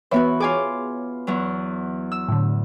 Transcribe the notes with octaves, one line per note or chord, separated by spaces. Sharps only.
E3 B3 F#4 B4 C#5 E5
F4 G#4 C#5 G#5 D6
E2 F#3
E6
A2 D3